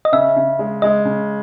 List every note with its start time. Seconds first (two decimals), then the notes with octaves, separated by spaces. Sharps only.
0.05 D#5
0.12 C#3 E5
0.36 C#3
0.59 G#3
0.82 G#3 D#5
1.05 C#3